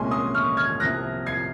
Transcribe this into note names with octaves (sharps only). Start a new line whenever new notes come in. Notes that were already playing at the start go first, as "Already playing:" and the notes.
Already playing: C2 A#2 G#3 C#4 G#5 C6
C6 D#6
C#6 F6
F6 G#6
C2 C3 F3 A#3 F#6 A#6
G#6 C7